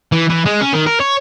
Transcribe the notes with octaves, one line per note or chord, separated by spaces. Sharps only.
E3
E3
G#3
C#4
D#3
A#4
C#5